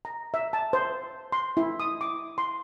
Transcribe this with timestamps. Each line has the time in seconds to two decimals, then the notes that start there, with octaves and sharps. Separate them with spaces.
0.05 A#5
0.34 E5
0.53 A5
0.73 C5
1.32 C6
1.57 E4
1.80 D#6
2.01 D6
2.38 C6